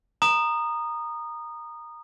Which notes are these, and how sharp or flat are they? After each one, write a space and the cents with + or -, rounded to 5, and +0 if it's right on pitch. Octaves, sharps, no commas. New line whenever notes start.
A#5 +0 D#6 -20